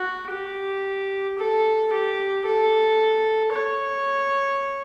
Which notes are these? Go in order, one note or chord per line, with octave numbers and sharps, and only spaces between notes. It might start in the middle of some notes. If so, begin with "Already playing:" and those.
Already playing: F#4
G4
A4
G4
A4
C#5